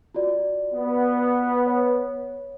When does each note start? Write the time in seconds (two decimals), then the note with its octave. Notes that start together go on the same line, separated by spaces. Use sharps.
0.15 F4 F#4 D5
0.73 B3
1.66 C#5